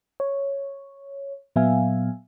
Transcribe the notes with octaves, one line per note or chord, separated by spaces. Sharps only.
C#5
A#2 F#3 B3 E5 F5 G#5